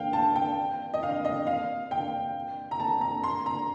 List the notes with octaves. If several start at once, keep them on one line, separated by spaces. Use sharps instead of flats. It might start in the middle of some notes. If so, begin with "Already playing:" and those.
Already playing: F5 G5
A5
G5
D#5
F5
D#5
F5
G5
A#5
A5
A#5
C6
A#5